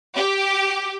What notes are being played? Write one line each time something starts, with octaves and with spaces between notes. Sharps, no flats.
G4